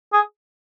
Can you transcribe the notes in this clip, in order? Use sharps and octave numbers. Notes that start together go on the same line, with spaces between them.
G#4